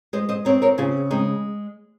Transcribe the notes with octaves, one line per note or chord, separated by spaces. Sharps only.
G#3 C5 D#5
C5 D#5
C4 A#4 C#5
A#4 C#5
C#3 F4 G#4
G#3 C4 D#4